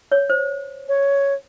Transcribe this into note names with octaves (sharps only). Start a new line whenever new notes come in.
C#5
C5
C#5